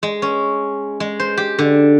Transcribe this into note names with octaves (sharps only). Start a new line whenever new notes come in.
G#3
C#4
G#3
C5
G4
D3